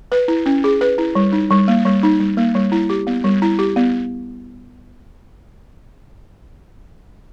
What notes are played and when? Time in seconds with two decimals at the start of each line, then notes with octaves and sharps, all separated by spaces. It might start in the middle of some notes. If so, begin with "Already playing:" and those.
0.12 B4
0.28 E4
0.46 C#4
0.64 G#4
0.81 B4
0.98 E4
1.15 G3
1.33 D#4
1.50 G3
1.68 A#3
1.85 G3
2.03 D#4
2.20 G3
2.37 A#3
2.55 G3
2.72 E4
2.90 G4
3.07 B3
3.24 G3
3.42 E4
3.59 G4
3.76 B3